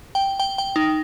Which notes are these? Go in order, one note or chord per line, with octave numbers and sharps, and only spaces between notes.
G5
G5
G5
D#4